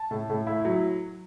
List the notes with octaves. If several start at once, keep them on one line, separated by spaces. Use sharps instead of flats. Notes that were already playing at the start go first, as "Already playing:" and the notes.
Already playing: A5
A2
A2
E4
F#3